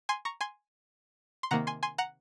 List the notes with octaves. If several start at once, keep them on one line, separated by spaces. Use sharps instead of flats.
G#5 C6
A#5 C#6
G#5 C6
C6
C3 D#3 A#3 F#5 A#5
G#5 C6
G#5 C6
F#5 A#5